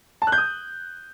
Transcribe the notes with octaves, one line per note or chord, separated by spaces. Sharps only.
A5
F#6
G6
D#6